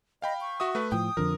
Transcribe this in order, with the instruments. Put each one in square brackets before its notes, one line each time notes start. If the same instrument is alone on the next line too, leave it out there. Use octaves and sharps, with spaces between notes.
[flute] D#5 [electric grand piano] F5 G5 B5
[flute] C#6
[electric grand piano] F#4 E5 D#6
A3 B4
[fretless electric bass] A2 F3 [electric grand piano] G5 [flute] D#6
[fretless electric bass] F2 D3 F3 [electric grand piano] A#4